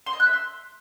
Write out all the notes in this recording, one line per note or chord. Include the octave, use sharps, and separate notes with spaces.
C6
D#5
F#6
E5
C6